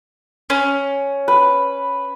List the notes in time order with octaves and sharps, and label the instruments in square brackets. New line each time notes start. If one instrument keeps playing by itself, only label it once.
[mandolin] C#4
[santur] B4